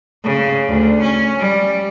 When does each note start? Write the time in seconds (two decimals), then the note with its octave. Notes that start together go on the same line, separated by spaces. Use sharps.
0.24 C#3
0.68 D2
1.02 C#4
1.39 G3